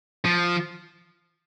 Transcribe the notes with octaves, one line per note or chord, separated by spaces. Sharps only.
F3